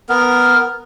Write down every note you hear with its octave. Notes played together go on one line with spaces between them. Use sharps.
B3 A#4